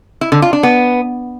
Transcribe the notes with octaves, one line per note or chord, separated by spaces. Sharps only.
E4
D3
F4
D4
B3